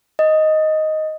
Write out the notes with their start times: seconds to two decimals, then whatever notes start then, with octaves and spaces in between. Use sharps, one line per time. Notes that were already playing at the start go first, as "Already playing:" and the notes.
0.19 D#5